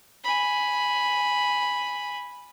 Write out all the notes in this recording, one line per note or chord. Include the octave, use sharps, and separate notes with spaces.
G#5 B5